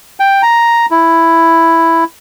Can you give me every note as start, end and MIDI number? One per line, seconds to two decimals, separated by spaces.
0.20 0.42 79
0.43 0.86 82
0.91 2.04 64